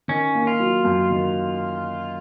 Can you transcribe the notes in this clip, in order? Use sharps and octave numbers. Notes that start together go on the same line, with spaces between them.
D#3 C#4
A#3
F4
F#3
F#2
D#3